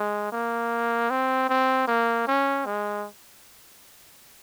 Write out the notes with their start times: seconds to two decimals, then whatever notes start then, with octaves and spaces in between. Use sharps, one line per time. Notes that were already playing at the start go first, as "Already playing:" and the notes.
Already playing: G#3
0.32 A#3
1.10 C4
1.49 C4
1.87 A#3
2.27 C#4
2.66 G#3